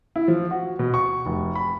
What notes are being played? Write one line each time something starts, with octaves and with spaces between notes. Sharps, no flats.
E4
F3
F#4
B2
C#6
F1
B5